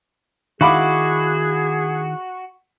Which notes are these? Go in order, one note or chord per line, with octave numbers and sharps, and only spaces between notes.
D#3 E4 F#4 G#4 F5 B5 D6